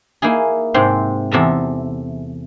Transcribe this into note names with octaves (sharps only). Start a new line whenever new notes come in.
A#3 D#4 E4 G#4
G#2 C3 C4
E2 C3 A4 E5 A#5